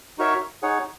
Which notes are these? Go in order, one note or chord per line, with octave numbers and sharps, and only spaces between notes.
D#4 F#4 A#4 C#5 E5
D#4 G#4 C#5 F#5